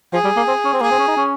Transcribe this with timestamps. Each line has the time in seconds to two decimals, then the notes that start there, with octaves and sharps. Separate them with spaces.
0.13 F3 G#4
0.24 G3
0.36 A#3
0.48 C4
0.64 C#4
0.73 C4
0.81 A#3 G#4
0.91 C4
0.99 C#4
1.08 D#4
1.16 C#4